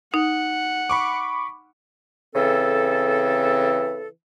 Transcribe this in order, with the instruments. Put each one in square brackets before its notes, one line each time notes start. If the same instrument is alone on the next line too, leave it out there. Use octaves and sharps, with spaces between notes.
[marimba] D#4 [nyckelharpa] F#5
[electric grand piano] B5 C#6 D6
[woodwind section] C#3 E3 C4 A4